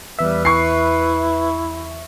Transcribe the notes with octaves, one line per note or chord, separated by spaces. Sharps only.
E2 G3 B4 E5
E4 C#6 C7